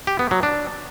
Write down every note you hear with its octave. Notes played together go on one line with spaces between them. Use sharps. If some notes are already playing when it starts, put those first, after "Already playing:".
G4
B3
F#3
D4